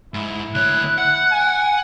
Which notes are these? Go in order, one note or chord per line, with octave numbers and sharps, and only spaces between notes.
G#2 E4
D2 C#5 F#6
F#5
G#5